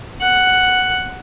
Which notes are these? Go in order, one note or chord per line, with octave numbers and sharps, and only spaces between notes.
F#5